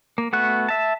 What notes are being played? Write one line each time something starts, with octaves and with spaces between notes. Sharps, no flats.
A#3
A3 B3 F#4 F#6
E5 A5